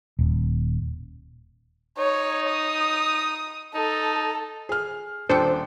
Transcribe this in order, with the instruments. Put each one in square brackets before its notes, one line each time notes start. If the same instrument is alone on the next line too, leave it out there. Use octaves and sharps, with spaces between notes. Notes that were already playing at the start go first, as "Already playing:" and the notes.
[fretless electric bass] D#1
[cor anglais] D#4 [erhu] C#5
[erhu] D#6
[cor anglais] D#4 [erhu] A4
[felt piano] G#4 F6
[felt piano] D#1 G5 C#7 [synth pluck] D4 A4 C5